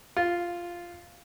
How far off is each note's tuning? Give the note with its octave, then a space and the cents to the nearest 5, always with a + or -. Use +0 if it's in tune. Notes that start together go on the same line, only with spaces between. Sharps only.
F4 -5